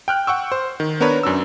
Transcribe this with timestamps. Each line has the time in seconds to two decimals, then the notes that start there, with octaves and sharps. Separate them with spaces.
0.08 G5 F6 F#6
0.27 F#5 G5 C#6 E6
0.52 C5
0.80 D#3
1.00 B3 D4 A#4 B4 C#5
1.23 F#2 D4 E6